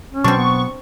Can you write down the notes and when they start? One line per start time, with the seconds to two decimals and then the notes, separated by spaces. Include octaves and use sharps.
0.13 C#4
0.24 B2 F#3 C4 D4 C#6
0.37 B3